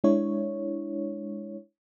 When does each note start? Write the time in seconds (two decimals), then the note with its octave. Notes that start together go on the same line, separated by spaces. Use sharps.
0.04 G#3 D4 E4 C#5